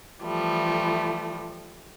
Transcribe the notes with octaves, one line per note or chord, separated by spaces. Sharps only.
E3 F3 G3 A3